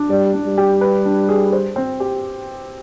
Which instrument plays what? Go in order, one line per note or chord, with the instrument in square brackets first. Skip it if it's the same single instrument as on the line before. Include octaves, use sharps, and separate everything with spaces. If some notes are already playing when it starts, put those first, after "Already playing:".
Already playing: [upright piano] D4
[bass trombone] G3 [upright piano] D5
[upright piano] D4
[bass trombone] G3
[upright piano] G4
B4
D4
G#4
C5
C4
G4